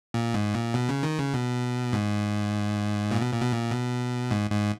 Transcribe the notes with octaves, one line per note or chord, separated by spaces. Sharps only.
A#2
G#2
A#2
B2
C#3
D#3
C#3
B2
G#2
A#2
B2
A#2
B2
A#2
B2
G#2
G#2